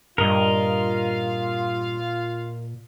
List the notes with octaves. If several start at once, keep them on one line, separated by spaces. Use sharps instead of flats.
G2 A#2 F4 A#4 D#5 F5